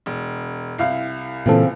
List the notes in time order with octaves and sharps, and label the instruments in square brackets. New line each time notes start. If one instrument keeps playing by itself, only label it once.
[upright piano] E1
C2 E4 F5
[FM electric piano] A#2 E3 A4 [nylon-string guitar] C#3 C4